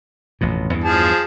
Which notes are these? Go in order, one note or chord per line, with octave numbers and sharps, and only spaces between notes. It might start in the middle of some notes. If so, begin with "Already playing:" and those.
A1 F2 B2
E2 G2 E3
F3 G#4 A5